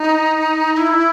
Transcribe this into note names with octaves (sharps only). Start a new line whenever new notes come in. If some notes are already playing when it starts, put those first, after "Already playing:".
Already playing: D#4
E4